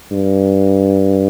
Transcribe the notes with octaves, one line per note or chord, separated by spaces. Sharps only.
G2